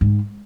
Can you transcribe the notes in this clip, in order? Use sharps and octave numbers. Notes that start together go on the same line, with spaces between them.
G#2